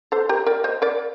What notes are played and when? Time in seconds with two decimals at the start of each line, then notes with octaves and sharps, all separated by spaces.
0.12 A4 C5
0.29 G4 A#4
0.46 A#4 D5
0.64 C5 D#5
0.82 A#4 D5